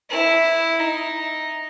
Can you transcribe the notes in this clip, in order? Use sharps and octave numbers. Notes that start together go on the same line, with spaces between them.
E4
D#4